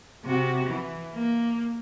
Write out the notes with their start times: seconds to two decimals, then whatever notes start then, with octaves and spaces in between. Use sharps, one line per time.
0.24 C3 F#4
0.65 E3
1.14 A#3